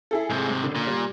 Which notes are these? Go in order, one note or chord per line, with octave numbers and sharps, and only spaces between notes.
E4 G#4 A4
G#2 C3
G#3
F#1 D3
A#2
G3